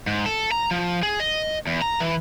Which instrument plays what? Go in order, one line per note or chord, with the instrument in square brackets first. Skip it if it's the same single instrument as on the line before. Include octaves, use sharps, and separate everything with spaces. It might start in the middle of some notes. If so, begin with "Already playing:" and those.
[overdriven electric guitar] G#2
A4
A#5
F3
G#4
D#5
E2
A#5
E3